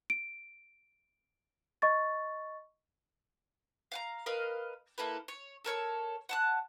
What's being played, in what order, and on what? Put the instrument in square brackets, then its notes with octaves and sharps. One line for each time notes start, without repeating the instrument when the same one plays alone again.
[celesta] D7
D#5 C#6 A6
[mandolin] F5 F#5 A#5
A#4 B4 D#5 F5
A#3 E4 A4 B4
C#5
A4 A#4 C#5 E6
F#5 A5 F#6